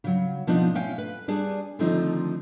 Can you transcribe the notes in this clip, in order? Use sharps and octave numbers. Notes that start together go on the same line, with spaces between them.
C#3 F#3
B2 F3 B3 C4 D4 D#4
A3 C#4 F5 G5
B4
G3 D4 G#4 G#5
D3 D#3 F3 A3 C4 D#4